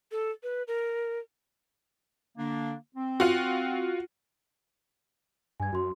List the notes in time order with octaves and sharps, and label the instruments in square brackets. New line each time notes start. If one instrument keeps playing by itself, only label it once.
[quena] A4
B4
A#4
[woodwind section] D3 A#3 D4
C4
[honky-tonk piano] F4 F#4
[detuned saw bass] G2 [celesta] G#5 G#6
[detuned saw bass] F#2 [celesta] F#4 C6